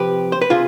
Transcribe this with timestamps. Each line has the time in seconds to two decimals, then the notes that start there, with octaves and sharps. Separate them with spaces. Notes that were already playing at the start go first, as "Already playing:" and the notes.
Already playing: C3 F3 G4 B4
0.32 C5
0.41 B4
0.50 C3 F4 G#4